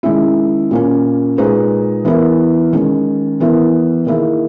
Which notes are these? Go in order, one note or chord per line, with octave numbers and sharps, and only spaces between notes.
D#3 G#3 C#4 E4
A#2 A#3 C#4
A#2 G#3 D#4 G#4 B4
E3 B3 E4 A#4
D#3 G#3 C#4
E3 B3 E4 A#4
D#3 A#3 E4 G#4